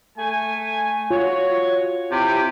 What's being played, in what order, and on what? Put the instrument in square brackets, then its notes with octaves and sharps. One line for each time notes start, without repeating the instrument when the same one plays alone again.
[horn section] A3 G#5
[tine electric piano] F4 [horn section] F#4 C#5
[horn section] C3 E4 G4